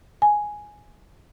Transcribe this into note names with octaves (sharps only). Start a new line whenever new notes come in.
G#5